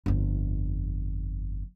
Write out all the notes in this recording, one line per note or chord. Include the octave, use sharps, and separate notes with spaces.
G1 F2